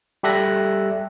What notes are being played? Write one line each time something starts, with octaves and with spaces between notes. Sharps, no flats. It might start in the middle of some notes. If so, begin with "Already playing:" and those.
G3 G4 A4 E5 F#6 A#6